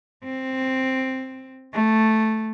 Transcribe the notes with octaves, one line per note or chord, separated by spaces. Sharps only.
C4
A3